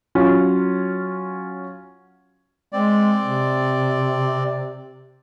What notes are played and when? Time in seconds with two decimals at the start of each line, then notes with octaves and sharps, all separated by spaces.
0.15 F#3 C#4 F4
2.72 G#3 C4 D5
3.22 C3